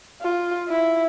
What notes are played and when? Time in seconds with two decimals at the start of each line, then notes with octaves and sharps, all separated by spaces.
0.22 F4
0.69 E4